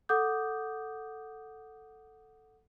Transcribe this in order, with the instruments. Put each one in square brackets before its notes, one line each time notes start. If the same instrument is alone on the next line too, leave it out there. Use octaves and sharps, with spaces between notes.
[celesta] A4 F#5 D6 D#6 G6